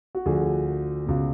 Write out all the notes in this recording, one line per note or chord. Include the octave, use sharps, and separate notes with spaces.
F#4
D2 D3 F3 G#4
C#2 B2